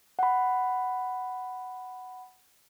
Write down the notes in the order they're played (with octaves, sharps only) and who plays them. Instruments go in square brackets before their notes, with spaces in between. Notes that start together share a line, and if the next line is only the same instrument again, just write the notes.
[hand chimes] F#5 B5